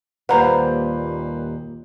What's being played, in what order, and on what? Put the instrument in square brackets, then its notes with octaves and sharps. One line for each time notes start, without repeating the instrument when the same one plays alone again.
[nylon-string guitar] D#2 G3 F5 [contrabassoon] A#2 [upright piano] B4 C5 [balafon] F#5 A#5